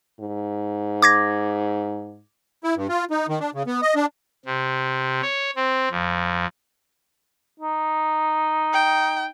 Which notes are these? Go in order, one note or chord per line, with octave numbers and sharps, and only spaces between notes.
G#2
D6 G#6 A#6
E4
G2
F4
D#4
D#3
D4
C#3
B3
D#5
D4
C3
C#5
C4
F2
D#4
G5